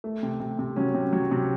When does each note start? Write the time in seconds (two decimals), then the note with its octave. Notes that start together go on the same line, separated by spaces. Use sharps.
0.04 A3
0.23 C3
0.40 C3
0.59 C3
0.76 F#3 C#4
0.95 C3
1.13 F#3
1.31 C3